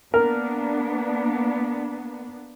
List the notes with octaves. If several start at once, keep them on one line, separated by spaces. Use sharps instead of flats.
A#3 B3 D4 A#4